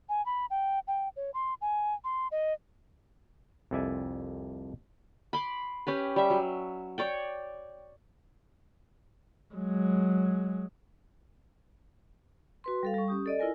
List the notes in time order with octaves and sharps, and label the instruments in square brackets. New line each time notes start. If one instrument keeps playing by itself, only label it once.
[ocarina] G#5
B5
G5
G5
C#5
C6
G#5
C6
D#5
[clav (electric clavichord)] C2 F2 A4 D5 E5 G#5
[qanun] B5 C6 D6
C#4 G4 B4
G3 E5
F#3
C#5 D5 G5
[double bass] F#3 G#3
[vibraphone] F#4 B4 C6
G3 A4 F5
G3 C#6
C#4 G4 D#6
A4 D5 D#5
E4 F4 A#4 G#5